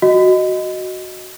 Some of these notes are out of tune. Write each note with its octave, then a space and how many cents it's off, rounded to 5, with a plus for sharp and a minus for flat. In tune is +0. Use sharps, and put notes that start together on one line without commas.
F#4 +0 D#5 +0